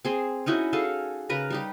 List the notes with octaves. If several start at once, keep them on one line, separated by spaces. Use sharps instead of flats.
C4 G#4 C6
C#4 D#4 E4 F#4
F#4 G#4 A4 F5
C#3 A#4 B4 A#5
G3 D#4 G4